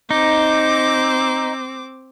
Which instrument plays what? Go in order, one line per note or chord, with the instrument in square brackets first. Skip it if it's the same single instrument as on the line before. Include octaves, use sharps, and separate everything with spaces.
[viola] C4 D6 [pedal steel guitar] D#4